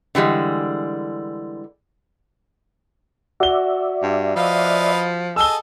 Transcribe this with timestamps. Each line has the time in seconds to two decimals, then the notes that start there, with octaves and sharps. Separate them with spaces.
0.15 D3 E3 G3 G#3
3.40 F#4 D5 E5 G7
4.03 G2
4.36 F3 B4 D#5 F5
5.36 G#4 A4 D#5 E6 G7